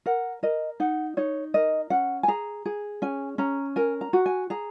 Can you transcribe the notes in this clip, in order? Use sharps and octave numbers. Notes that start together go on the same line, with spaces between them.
A#4 F#5
A#4 D#5
D#4 F#5
D#4 C#5
A#4 D#5
C#4 F#5
G#5
G#4 A#5
G#4
C#4 G#5
C#4 A#5
A#4 G#5
A#5
F#4
G#5
G#4 A#5